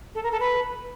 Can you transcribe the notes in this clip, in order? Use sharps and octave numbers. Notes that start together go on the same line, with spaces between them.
A4
A#4
A4
B4